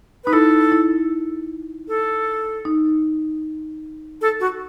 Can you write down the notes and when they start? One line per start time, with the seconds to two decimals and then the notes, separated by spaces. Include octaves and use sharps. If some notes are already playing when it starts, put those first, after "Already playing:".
0.24 D#4 B4
0.33 E4 A4
0.72 E4
1.88 A4
2.65 D#4
4.21 A4
4.40 F#4